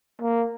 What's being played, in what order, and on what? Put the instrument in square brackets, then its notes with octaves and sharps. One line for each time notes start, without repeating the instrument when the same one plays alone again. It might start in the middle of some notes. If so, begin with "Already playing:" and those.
[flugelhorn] A#3